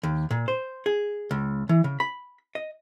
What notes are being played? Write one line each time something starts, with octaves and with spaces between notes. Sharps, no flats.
D#2
A#2
C5
G#4
C#2
E3
C#3
B5
D#5